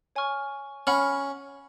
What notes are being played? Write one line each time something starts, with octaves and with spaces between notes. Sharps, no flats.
C#5 G#5 C#6 F6
C#4 F#5 B5 F6